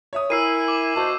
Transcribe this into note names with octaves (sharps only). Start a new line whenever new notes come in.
C#5 E5 D#6
E4 A#4 G#5 E6 C7 D#7
D6
B2 F#4 C5 A5